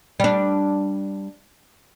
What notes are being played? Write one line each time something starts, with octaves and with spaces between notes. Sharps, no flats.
G3 D4